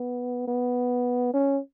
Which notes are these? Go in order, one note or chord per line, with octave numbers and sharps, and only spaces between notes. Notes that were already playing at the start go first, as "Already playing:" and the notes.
Already playing: B3
B3
C#4